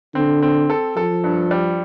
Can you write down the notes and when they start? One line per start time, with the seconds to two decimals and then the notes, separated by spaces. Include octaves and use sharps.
0.15 D3 C4
0.42 C4
0.70 A4
0.96 F3 A4
1.24 G2
1.51 G3